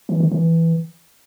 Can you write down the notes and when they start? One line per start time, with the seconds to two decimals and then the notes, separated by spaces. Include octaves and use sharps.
0.09 E3
0.20 D#3
0.32 E3